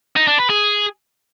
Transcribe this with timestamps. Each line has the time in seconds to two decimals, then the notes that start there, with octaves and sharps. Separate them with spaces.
0.16 D#4
0.27 D4
0.39 B4
0.50 G#4